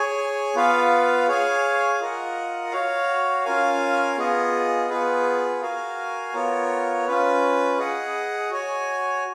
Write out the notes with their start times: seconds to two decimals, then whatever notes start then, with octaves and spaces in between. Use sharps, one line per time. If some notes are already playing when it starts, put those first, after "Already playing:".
Already playing: G#4 C#5 G#5
0.55 B3 F4 B4 F5
1.28 G#4 C#5 F5 G#5
2.00 F4 A#4 D#5 F#5
2.72 F#4 C#5 F5
3.45 C#4 F4 A#4 F5 G#5
4.17 B3 F4 G#4 D#5
4.89 B3 F4 G#4 B4
5.62 F#4 A#4 F5 G#5
6.34 B3 F4 A#4 C#5
7.07 C#4 F4 B4
7.78 G#4 D#5 F#5
8.50 F#4 C#5 G#5